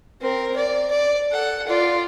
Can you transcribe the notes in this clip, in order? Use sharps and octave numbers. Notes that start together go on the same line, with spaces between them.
C4 A#4
D5
D5
A4 F#5
F4 D5